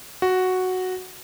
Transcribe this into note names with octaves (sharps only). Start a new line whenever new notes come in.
F#4